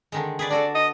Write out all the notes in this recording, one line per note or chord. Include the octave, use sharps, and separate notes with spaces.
D3 D#3 G#3
G#4 B4 D5
D4 F#4 A4 D5
D#5